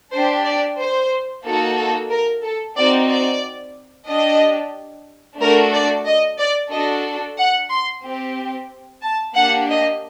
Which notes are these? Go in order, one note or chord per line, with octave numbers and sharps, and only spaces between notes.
D4 G4 C5
D5
C5
A#3 D#4 F#4 A4
A4
A#4
A4
C4 D#4 F#4 D5
D5
D4 G4 D#5
A3 D4 F#4 A4 A#4
D5
D#5
D5
D4 F#4 A4 D#5
F#5
C6
C4 G4
A5
A#3 D4 G4 F#5
D#5